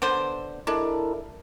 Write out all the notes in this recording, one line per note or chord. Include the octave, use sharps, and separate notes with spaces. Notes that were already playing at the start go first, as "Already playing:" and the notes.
D3 B3 C5
G#3 D4 E4 A4 A#4